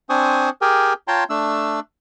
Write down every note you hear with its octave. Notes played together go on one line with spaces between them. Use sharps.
C4 D4 C5 G#5 C#6 D#6
G4 G#4 A#4 G5 G#5
F4 C#5 G5 A5 A#5 C6
A3 D4 E6